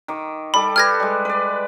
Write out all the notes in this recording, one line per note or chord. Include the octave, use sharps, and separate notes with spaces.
D#3 D6
G3 A4 B5 D6
G4 A4 B4 F6 G#6 A#6
G3 G#3
B4 D5